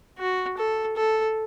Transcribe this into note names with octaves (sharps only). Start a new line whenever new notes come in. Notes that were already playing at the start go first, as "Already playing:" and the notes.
F#4
A4
A4